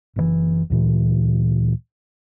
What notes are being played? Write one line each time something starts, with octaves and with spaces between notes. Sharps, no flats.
F#1 A#2 E3
D2 A#2 E3